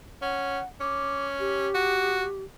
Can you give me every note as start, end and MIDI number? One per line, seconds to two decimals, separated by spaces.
0.22 0.60 61
0.22 0.66 78
0.80 1.68 61
0.80 1.26 86
1.40 2.43 67
1.75 2.25 66